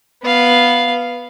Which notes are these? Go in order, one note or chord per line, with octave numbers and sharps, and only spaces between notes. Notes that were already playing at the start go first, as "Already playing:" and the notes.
B3 F5